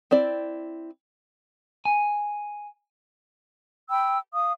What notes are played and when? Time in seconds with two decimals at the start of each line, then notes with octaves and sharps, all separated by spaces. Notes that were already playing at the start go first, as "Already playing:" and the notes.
0.11 C4 E4 D5
1.85 G#5
3.90 G5 B5 E6
4.33 F5 D#6